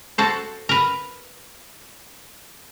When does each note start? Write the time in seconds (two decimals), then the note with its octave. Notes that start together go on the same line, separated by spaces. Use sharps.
0.18 F#4 A4 C5
0.69 A#4 B4